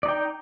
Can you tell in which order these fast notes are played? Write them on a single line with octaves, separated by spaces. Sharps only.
D5 D#4 G5